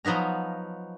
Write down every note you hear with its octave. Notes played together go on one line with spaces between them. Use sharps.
F3 F#3 B3 D#4 A#5